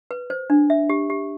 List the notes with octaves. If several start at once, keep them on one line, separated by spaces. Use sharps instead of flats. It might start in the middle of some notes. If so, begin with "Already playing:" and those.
B4
C5
D4
E5
G4
G4